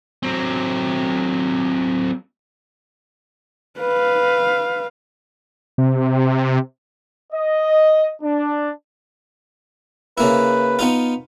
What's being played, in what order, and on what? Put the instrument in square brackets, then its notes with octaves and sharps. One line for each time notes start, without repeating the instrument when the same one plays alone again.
[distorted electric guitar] F#3 C4
[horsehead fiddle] B4 F5
[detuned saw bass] C3
[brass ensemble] D#5
D4
[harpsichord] C#3 A#3 E4 [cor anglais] B4
[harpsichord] B3 D#4 F4